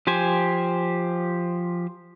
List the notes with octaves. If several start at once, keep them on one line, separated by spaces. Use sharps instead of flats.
F3 G4 C5 G#5